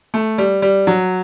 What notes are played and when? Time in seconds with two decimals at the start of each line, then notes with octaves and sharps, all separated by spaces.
0.14 A3
0.38 G3
0.62 G3
0.87 F#3